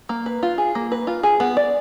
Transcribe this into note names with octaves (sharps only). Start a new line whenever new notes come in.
A#3
B4
F4
G#4
A#3
B4
F4
G#4
B3
D5